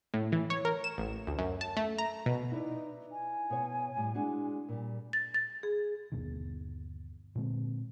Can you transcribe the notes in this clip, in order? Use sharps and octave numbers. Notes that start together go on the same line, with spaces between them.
A2
E3
C#5
A#4
E7
A1
D2
F#2
A5
A3
A#5
B2
D#4 E4 B4 D5
G#5
B2 C#5
A2 G3
G#3 D4 F#4
A#2 G3
A6
A6
G#4
G1 D#2 B2 D#3
A#2 D3 G#3 C4